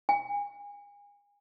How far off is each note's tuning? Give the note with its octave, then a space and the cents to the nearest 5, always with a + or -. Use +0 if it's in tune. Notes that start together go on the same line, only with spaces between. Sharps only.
G#5 -35